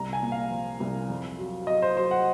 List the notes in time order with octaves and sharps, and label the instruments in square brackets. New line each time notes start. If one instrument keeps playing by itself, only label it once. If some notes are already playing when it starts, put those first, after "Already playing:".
Already playing: [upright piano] C2 A#5
G#5
A#2
F5
F3
C2
F2
F#3
F#3 D#5
C5
F#3 C5
F#5